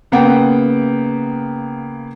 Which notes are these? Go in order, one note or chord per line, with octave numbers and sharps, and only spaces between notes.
C#3 A#3 B3 F#5 G5